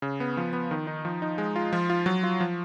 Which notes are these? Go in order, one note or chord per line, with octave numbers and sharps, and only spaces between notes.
C#3
B3
F3
B3
D#3
D#4
F3
D#4
G#3
F4
F3
F4
F#3
F4
F3